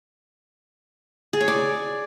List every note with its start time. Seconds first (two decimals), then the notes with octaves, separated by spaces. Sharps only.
1.33 G#4
1.41 C#5
1.48 D5